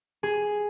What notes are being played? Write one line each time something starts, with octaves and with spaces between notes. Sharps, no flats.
G#4